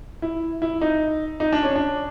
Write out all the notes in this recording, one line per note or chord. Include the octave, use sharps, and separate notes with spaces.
E4
E4
D#4
D#4
D4
C#4
D4